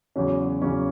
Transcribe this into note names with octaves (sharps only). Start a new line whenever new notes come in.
E2 C#3 F#3 C#4
E2 C#3 F#3 C#4